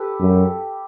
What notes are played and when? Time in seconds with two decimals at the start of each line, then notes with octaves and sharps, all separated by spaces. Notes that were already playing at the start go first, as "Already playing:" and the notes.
Already playing: G4 A4 B4
0.20 F#2